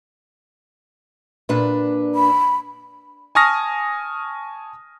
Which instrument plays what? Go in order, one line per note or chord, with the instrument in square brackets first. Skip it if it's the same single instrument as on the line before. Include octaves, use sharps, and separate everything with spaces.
[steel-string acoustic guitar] A#2 D4 B4
[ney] B5
[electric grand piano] G#5 A5 C#6 D#6 F6 A#6